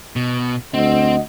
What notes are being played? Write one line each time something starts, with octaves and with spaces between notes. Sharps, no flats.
B2
D2 C4 D#5 F#5